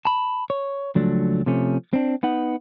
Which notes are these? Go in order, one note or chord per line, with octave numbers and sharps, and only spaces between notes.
A5 B5
C#5
C#2 F3 F#3 A3 D4
C3 F3 A3 C#4
C4 D4
B3 D#4 F#5